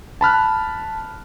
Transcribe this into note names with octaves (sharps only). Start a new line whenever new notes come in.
A5 B5 F6 F#6